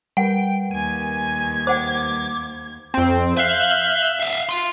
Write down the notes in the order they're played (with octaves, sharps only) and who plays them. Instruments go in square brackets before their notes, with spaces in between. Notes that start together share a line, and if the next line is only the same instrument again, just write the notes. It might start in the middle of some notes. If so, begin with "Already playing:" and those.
[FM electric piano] G3 A#4 B4 [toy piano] F#5 [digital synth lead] G5
[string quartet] D#2 G#6 [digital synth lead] G#5
[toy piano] C5 F#5 G5 [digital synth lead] D6
[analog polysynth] F2 C4
[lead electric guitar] E5 [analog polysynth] F5 F#6 G6
[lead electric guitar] E5 F5 [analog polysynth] C7
[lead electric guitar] F5 C6